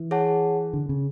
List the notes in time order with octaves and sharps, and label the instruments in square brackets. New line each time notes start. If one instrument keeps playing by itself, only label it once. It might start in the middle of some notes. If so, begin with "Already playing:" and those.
Already playing: [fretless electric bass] E3
[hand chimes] G#4 C#5 F#5 A5
[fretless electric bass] D3
C#3